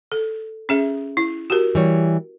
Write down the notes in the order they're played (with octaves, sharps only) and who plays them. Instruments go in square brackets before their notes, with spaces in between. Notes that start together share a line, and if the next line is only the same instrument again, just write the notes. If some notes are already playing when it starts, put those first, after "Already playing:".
[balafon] A4
C#4 G#4 E5
E4
F#4 G4 A#4
[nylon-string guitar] E3 G3 C#5